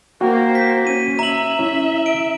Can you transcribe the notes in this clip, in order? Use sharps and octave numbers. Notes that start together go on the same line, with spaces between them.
A#3 F#4 C5 G5
B6
C#4 D#7
E5 A#5 F#7
C#4 E4
D7